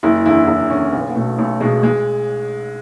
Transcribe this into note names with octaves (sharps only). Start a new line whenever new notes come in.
F#1 E4
E2 D3 E4
F#1 E4
E2 D3 C#4
B1 B3
B3
B2 A3
B1 A3
B2 G#3
G#3